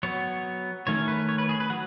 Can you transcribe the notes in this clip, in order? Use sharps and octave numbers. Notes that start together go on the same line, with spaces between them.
F#3 B3 C#5
D#3 A3 C#4 C#5
B4
C#5
B4
G#4
B4
F#3 F#5